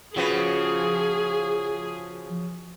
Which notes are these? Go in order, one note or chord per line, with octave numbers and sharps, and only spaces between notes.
C#3 F3 F#4 G#4 B4